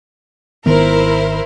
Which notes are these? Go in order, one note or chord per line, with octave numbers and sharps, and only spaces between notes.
G#1 D#3 B3 E4 A#4 C5